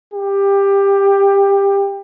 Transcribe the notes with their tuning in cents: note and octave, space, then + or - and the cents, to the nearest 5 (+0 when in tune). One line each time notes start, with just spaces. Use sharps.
G4 +20